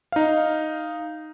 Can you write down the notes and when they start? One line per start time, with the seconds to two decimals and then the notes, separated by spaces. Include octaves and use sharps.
0.12 D#4 F5